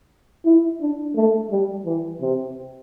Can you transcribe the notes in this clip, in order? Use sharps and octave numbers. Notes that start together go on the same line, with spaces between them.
E4
D4
A3
G3
E3
C3